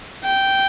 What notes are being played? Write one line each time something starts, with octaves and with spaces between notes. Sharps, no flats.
G5